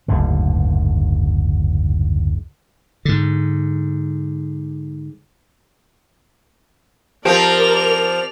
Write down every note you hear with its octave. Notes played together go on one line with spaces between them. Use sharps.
F#1 D2 G#2 D3
G#2 D3
F3 C4 G4 A#4 D5 F7